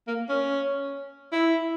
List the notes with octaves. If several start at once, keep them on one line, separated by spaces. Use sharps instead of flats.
A#3
C#4
E4